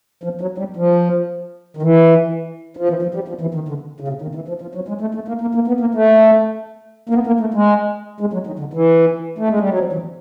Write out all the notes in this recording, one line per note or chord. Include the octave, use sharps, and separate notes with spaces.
F3
F#3
G3
F3
D#3
E3
F3
E3
F3
G3
F3
E3
D#3
D3
C#3
C3
D#3
E3
F3
F3
F#3
G#3
A3
A3
A#3
A#3
A#3
B3
A#3
A3
A#3
B3
A#3
A3
G#3
G#3
F#3
D#3
D3
E3
A3
G#3
G3
F#3
F3
E3